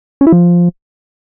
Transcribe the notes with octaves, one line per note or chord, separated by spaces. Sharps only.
C#4
E4
F3